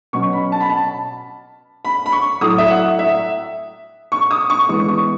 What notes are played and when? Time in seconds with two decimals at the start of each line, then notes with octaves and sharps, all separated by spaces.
0.13 B2 F#3 C#4 C#6
0.33 B5
0.52 A5
0.61 B5
0.70 A5
1.85 B5
2.06 B5
2.12 C#6
2.41 A2 F#3 A3 D#6
2.58 E5
2.70 F#5
2.99 E5
4.12 C#6
4.31 D#6
4.50 C#6
4.69 E3 G#3 B3 C#6
4.88 C#6